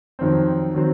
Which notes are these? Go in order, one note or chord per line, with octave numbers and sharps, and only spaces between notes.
F2 D#3 F#3 C4
D#3 F#3 C4